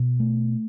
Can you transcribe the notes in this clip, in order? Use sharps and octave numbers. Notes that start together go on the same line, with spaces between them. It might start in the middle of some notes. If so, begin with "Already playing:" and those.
Already playing: B2
A3